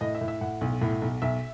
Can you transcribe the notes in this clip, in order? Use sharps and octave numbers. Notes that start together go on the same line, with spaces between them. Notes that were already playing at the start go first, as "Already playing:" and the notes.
A2 D#5
E5
A2
E5
A2 F#5
B1
A2
B1
B1 E5